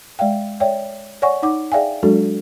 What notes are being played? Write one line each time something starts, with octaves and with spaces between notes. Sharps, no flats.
G#3 D5 E5 F5 G5
C#5 D5 E5 G5
C#5 D5 F#5 G#5 C#6
D#4 F#5 D6
G#4 D5 E5 F5 G5 G#5
F#3 G#3 D4 F#4 A4